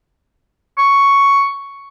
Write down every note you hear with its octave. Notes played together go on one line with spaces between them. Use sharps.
C#6